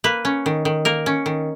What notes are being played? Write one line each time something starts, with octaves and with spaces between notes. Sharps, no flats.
A#3 B4
C#4
D#3
D#3
A#3 A#4
C#4
D#3